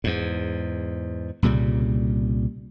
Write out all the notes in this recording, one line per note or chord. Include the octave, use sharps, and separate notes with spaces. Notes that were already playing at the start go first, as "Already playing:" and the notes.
E2 G#2
C2 A#2 C#3 G3